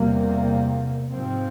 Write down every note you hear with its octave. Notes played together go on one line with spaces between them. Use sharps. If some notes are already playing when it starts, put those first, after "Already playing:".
Already playing: E2 C3 G3 A#3
G#2 F3 C4